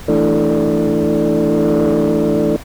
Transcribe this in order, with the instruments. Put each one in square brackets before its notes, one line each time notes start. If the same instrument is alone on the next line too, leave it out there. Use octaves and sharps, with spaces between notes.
[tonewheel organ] E3 A3 D4